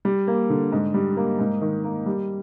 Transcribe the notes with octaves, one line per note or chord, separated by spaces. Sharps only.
G3
A#3
D3
G#2
G3
A#3
G#2
D#3
A#3
G3